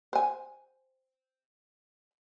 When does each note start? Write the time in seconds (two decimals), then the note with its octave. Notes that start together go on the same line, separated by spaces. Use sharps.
0.13 C5 G#5